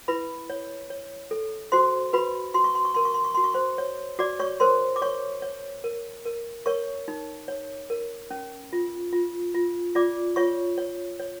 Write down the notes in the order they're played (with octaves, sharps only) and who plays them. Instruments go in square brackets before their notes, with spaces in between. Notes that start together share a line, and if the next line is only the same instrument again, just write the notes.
[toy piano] E4 B4 B5
C#5
C#5
A4
F#4 C5 C6
F#4 B4 B5
F#4 C6
C#6
C6
C#6
A#4 C6
C#6
C6
C#6
F#4 C6
C#6
C5 C6
C#5
F#4 D5 D6
C#5 C#6
A#4 C5 C6
D6
C#5 C#6
C#5
A#4
A#4
A#4 C#5 C#6
D#4
C#5
A#4
C#4
F4
F4
F4
F4 D5 D6
F4 C#5 C#6
C#5
C#5